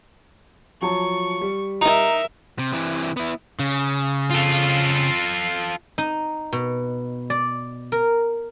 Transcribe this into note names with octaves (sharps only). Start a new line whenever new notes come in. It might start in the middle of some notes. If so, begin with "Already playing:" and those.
F3 F#3 A5 C#6
G3
D#4 A#4 D#5 E5 A#5
C3
C3 E3
B3 E4
C#3
F4 A4
D#4
B2
D5
A#4